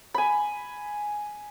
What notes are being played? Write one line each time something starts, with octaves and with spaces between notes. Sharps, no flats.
G#5 B5